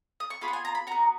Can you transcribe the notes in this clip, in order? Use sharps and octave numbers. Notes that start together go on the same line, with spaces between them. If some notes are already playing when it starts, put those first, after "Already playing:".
D#6
C#6
B3 F4 G#4 B5
F#5
G#5
A#5
B5
B3 F#4 A#5